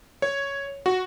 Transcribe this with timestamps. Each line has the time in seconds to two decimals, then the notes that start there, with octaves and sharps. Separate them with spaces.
0.22 C#5
0.86 F#4